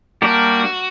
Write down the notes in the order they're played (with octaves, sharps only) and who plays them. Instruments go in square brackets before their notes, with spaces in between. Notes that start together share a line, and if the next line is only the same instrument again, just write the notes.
[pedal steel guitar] G3 A#3 D4 G4 A#4 [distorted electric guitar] F#4